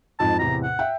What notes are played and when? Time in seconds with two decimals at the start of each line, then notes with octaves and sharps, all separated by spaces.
0.20 F2 G#2 F3 A5
0.39 E2 A2 C3 A#5
0.64 F#5
0.79 E5 G5